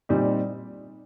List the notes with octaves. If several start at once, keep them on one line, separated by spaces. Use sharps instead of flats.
A#2 G3 C4 D#4